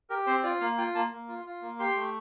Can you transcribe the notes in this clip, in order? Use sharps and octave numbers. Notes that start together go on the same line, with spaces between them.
G4 A#4
C4 C5
F4 D5
A#3 F5
F4 G5
A#3 A5
A#3
F4
F4
A#3
G4 C6
A3